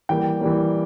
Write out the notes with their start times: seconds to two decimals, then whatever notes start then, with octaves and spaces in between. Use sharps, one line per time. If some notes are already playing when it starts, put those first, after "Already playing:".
0.09 E3 G3 A#3 G5
0.41 E3 G3 A#3